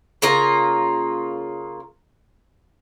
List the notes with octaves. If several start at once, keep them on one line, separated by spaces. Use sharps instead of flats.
C#3 A#3 F4 A#5